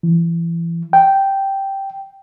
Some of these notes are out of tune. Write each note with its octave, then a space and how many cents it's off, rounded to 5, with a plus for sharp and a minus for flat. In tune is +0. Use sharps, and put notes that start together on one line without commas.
E3 +30
G5 -5